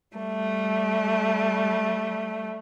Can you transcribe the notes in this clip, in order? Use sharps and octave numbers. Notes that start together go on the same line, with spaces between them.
G3 A3